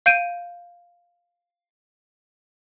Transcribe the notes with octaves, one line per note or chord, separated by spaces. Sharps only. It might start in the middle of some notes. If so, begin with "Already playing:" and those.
F5 G6 D7 D#7